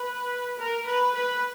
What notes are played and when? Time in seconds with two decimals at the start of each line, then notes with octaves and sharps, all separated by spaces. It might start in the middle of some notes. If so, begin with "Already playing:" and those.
Already playing: B4
0.59 A#4
0.86 B4
1.15 B4